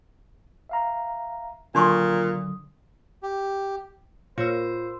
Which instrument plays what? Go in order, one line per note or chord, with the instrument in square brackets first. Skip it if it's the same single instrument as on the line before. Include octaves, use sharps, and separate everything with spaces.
[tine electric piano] E5 F5 A#5
[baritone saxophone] A#2 [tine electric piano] D3 F#3 D#6 [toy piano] D4 C6 C#6
[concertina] G4
[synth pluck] A#2 C#5 [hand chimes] F4 E6 [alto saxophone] C5